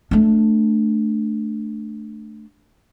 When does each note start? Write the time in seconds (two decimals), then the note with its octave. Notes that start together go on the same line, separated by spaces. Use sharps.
0.11 A3 D4